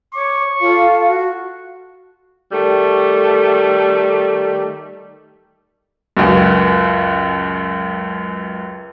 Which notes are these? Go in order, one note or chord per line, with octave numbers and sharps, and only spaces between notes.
C#5 C#6 D6
F4 A4 F5
F#4
D#3 G3 A3
C#2 F#2